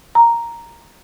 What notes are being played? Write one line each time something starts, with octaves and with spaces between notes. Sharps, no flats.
A#5